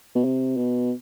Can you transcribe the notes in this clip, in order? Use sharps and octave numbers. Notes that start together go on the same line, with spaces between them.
B2
C3
B2